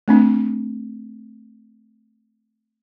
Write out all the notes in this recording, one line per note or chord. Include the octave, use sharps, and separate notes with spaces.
A3 C4 D4